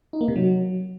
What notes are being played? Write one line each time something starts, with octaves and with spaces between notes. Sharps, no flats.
D#4
A#3
C3
F#3